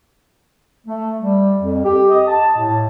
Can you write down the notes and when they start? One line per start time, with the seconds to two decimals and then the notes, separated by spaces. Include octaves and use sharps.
0.86 A3
1.21 G3
1.59 F2
1.84 G4
2.10 D#5
2.28 A5
2.58 A2